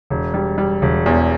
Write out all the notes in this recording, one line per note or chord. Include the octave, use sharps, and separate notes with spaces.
E1
G3
G3
E1
E2